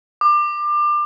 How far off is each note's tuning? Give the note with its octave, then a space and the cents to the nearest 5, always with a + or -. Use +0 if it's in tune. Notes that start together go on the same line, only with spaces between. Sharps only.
D6 +25